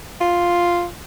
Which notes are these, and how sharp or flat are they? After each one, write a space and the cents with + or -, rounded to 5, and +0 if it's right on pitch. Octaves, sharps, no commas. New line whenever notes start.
F4 +0